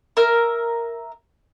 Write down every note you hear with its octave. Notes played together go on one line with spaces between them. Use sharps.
A#4 E5 F6